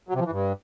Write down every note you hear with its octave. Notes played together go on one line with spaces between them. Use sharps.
F#3
C3
F3
E3
G2